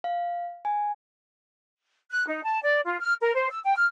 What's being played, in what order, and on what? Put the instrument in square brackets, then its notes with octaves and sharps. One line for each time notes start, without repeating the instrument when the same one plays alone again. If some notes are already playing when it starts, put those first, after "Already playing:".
[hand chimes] F5
G#5
[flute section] F#6
D#4
A5
D5
F4
F6
A#4
C5
E6
G5
F6